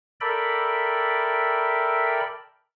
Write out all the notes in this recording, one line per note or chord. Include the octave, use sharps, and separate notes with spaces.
A4 A#4 D5 E5 G5 B5